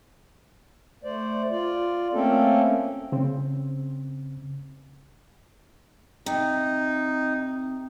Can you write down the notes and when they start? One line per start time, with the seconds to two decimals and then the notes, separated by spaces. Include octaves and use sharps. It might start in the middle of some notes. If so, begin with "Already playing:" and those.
1.04 A3 C5 D5
1.51 F4 D5
2.13 A3 A#3 C4 C#4 A4
3.12 C#3 C4
6.26 C3 D#4